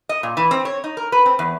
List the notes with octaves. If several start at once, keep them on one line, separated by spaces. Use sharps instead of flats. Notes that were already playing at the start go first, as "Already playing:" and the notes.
D#5
A#2
E3
C4
C#5
D#4
A#4
B4
C4
E2